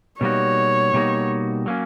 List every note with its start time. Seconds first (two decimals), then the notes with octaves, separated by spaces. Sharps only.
0.21 B2 G3 A#3 D#4 F#4 C#5
0.93 B2 G3 A#3 D#4 F#4
1.66 F#3 A#3 C#4